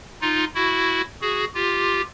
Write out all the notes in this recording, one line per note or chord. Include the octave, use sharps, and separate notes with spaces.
D#4 F4
E4 F#4
F#4 G#4
F4 G4